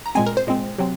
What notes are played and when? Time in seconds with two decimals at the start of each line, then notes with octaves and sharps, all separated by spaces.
0.06 A#5
0.15 A#2 G#3 C4 G#5
0.26 A#4
0.37 C5
0.47 A#2 G#3 C4
0.78 C3 F#3 C4